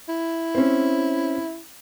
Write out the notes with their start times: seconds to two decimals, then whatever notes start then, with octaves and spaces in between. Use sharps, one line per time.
0.08 E4
0.55 C4 C#4